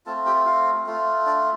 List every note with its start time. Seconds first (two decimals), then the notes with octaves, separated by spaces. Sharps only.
0.06 A3 C4 F4 A4 A5
0.26 G4 G5
0.46 F4 F5
0.86 A3 F4
1.26 D4 D5